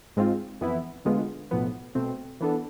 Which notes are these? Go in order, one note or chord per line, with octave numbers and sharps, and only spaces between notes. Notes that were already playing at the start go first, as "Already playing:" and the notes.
G#2 G#3 C4 F4
F2 E3 B3 E4
D2 D3 G#3 B3 F4
B1 A2 F3 B3
B2 A3 C4
E3 B3 D4 A4